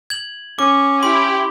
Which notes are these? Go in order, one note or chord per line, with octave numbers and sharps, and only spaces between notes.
G#6 F#7
C#4 D6
E4 G4 C6